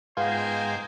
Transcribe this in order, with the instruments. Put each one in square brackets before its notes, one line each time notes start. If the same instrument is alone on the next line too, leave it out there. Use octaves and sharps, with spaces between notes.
[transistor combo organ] G#2 G5 G#5 [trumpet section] A#3 C5 [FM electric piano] B3 F4